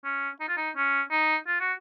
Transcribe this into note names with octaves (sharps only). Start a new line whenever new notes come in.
C#4
D#4
F4
D#4
C#4
D#4
F4
F#4